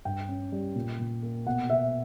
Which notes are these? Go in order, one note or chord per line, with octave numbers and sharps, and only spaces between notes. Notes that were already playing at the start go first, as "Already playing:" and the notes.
G2 G5
C#4
G3
A#2
A#2
A#3
B2 F#5
B2 E5